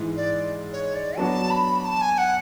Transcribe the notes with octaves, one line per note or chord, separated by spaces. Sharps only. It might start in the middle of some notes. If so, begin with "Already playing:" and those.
Already playing: G#2 E3 G#3
D5
C#5
D5
F#3 B3 D4 F#4 A5
B5
A5
G#5
F#5